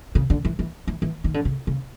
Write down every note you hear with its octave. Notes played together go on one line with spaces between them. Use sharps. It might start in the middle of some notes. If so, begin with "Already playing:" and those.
C#3
D3
E3
E3
E3
E3
D#3
D3
C#3
C#3